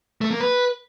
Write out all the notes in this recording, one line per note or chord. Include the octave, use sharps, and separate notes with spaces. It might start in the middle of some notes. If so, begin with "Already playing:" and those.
A3
A#3
B4